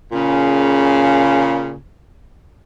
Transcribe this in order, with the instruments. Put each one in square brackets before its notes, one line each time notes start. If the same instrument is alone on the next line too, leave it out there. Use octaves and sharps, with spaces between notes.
[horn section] A#2 C#3